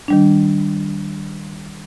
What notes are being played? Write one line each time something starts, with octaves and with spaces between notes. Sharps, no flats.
D#3 G3 D4